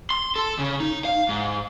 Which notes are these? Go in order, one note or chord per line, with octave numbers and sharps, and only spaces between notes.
C6
A4
C#3
D#4
F5
G#2